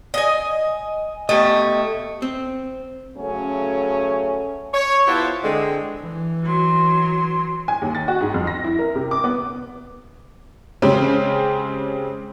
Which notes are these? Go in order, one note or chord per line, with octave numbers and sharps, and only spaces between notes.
D#5 G#5
B2 A3 G4 D#5
C4
C#3 F#3 A3 C#4
C#5
B3 E4 F4 G4 C5 A5
D3 G#3 C4
E3
F#3 C6
G#5
D#2
A6
F#4
G#2
F2
A#6
E4
A#4
C3
D6
B3
C#3 G#3 C4 C#4 G4 C5